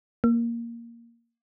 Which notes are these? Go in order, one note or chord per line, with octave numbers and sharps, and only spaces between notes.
A#3